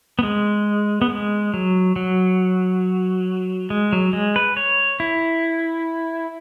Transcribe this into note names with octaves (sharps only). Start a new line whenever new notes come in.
B3
G#3
B3
G#3
F#3
F#3
G#3
F#3
G#3
B4
C#5
E4